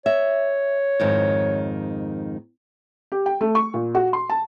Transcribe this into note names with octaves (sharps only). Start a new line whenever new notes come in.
C#5 E5
F2 G#2 D#3
G4
G5
A3
C#6
A#2
F#4
C6
A5